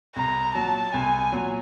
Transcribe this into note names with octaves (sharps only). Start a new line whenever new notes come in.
C2 A#5
A#2 F#3 A5
C2 G#5
A#2 F#3